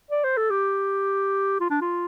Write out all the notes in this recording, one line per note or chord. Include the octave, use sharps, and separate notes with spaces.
D5
C5
A4
G4
F4
D4
F4